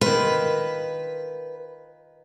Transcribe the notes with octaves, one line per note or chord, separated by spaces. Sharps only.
D#3 F4 B4